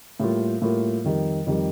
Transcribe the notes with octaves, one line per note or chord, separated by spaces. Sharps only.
A2 G3 A#3 F4
A2 G3 A#3 F4
F2 D#3 G3
F2 D#3 G3